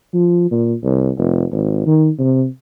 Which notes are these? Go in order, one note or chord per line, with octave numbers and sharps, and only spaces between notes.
F3
A#2
C2
F1
G#1
D#3
C3